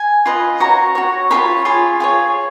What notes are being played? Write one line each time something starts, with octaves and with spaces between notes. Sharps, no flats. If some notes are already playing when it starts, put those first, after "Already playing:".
Already playing: G#5
F4 B4 D#5
F#4 C#5 A#5
F#4 C#5
F4 G#4 C#5 B5
F4 G#4 C#5
F4 G#4 C#5